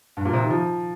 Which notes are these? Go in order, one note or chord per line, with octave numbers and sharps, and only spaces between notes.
G2
A#2
C3
D#3
F3